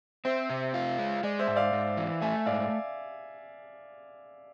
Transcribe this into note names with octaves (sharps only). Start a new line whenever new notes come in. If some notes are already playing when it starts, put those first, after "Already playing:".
C4 C5 E5
C3
F4
G#3
G#3 D5
C5 E5
G#2
D5 F5
G#2
E3
A3 E5 G#5
E5
G#2 D5 F5